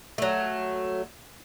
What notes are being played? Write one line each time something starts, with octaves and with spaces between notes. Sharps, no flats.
F#3 A3